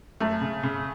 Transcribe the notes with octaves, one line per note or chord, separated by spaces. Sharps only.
F#2 A3
C#3
C#3